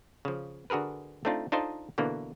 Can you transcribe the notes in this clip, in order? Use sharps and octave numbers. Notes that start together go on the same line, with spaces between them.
C#3 F3
D3 F#4 G#4 A#4 B4
A3 C4 D4 D#4 F4
D4 D#4 F4 A4 C5 D#5
B2 D3 E3 A#3